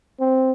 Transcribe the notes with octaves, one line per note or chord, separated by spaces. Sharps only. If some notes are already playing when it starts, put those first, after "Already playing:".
C4